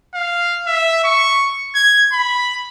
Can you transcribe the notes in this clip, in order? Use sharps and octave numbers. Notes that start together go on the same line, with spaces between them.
F5
E5
C#6
G#6
B5